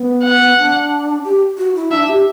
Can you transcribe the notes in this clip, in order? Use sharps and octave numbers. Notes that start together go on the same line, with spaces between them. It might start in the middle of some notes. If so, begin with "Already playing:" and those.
Already playing: B3
F#5
D4
G4
F#4
E4
D4 E5
G4